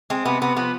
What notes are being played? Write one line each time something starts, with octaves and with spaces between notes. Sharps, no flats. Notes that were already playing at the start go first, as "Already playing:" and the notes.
G#3 C4
C3 B3
C3 B3
F3 B3